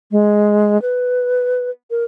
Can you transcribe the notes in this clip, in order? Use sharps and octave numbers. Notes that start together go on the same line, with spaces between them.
G#3
B4
A#4